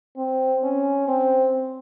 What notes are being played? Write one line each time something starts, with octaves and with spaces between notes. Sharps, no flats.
C4
C#4
C4